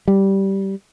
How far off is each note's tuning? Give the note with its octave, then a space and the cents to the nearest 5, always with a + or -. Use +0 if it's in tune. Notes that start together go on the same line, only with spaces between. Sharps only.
G3 -10